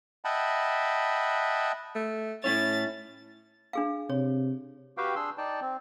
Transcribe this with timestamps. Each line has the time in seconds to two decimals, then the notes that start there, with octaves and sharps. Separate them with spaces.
0.25 D#5 E5 F#5 G5 A5 B5
1.95 A3
2.44 A2 C#4 E4 C#5 A6
3.73 D4 G#4 F5
4.10 C3 C#5
4.97 F#4 G4 B4 F5 G5
5.16 D4 G#4 C6 E6
5.38 D#4 D5 G5 A5
5.61 C4